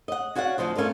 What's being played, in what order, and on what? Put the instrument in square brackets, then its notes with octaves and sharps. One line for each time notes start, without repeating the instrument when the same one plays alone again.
[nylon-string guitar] D#5 F#5
C#4 F#4 D5 F5 F#5
D2 D#3 F3 C5 D#5
A3 C#4 F4 A#4 D5